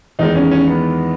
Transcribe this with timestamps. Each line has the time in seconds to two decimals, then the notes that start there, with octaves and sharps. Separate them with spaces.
0.19 E2 D#3 G#3 D#4
0.35 C#4
0.51 C#4
0.67 B3